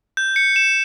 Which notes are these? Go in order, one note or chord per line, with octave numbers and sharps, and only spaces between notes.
G6
C#7
E7